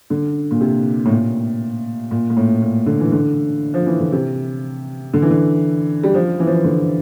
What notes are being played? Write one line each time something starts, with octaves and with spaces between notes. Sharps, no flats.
D3
A#2
C3
A2
A#2
A#2
A#2
A2
A#2
D3
E3
D3
F3
E3
D3
C3
D3
E3
D3
G3
F3
E3
F3
E3
D3